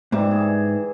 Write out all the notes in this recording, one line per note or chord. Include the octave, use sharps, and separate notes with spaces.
G#2 E3 G3 E5
G#4